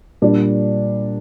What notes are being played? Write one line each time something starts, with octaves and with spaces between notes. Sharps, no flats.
A#2 G3 A#3 D4